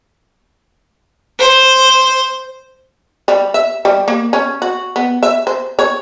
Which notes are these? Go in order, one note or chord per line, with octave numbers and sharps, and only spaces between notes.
C5
G3
E5
G3
A#3
C#4
F#4
B3
E5
C5
C#5